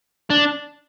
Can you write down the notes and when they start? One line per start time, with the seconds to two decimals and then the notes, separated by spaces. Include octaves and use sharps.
0.30 D4